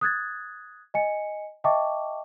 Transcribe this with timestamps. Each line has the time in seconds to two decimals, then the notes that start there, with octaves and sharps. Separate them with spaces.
0.01 D#6 F#6 G#6 A6
0.94 D#5 G#5 C#7
1.64 D#5 E5 G5 A5 C#6 D6